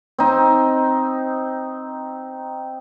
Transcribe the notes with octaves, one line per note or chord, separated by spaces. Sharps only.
C4 D#4